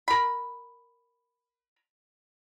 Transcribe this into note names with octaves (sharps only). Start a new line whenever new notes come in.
A#4 B5